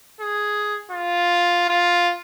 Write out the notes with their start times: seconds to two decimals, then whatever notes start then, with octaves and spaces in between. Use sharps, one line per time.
0.20 G#4
0.91 F4
1.69 F4